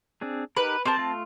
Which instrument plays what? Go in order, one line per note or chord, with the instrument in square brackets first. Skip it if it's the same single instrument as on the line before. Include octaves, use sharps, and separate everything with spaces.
[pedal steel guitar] C4 D4 G#4
[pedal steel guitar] D#4 G4 A#4 [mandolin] B4
[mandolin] C4 A5 [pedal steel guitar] G4 A#4 C5
[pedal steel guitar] A3 F4